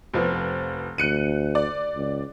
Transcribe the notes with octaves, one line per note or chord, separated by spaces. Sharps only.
F1 F3 B3
D2 F#6 C#7 D#7
D5
C#2